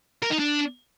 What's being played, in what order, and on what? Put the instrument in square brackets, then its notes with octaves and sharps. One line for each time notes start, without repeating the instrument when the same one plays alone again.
[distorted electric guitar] A#4
D#4
D4